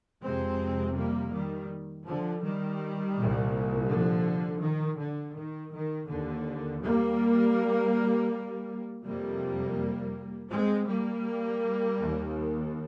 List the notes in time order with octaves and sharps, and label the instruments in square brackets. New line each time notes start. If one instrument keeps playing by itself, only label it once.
[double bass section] F2 C3 G#3 C4
G3 A#3
D#3 G3
D3 F3
D#3 G3
C2 A#2
D3 F3
D#3
D3
D#3
D#3
D#2 D3
G3 A#3
F2 C3 G3 A#3
G#3 C4
G3 A#3
D#2